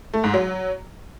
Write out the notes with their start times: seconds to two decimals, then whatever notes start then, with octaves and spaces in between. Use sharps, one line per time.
0.14 A3
0.24 G#2
0.34 F#3